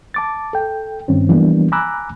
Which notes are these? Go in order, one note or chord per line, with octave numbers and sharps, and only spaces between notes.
A5 D6 A6
A4 G5
G2 D#3 C4 C#4
E3 F3 G3 A#3 B3 D4
G#5 A#5 B5 D6 E6 F#6